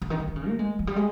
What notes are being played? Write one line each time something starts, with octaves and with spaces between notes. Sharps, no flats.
C#3
D#3
F3
D#3
C#3
A#3
G#3
F3
G3
G#3